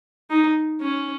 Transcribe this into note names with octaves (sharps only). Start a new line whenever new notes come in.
D#4
C#4